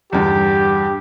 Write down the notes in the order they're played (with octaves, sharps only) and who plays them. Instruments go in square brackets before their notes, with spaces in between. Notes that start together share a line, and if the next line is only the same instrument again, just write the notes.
[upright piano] E2 G2 D3 [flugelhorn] G4